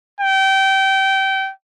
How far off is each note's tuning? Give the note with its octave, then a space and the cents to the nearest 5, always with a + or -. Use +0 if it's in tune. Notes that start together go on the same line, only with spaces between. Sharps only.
G5 -25